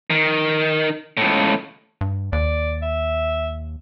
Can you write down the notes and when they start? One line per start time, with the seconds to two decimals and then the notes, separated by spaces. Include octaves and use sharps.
0.10 D#3
1.17 C#2 A2
2.01 G2
2.33 D#2 D5
2.82 E5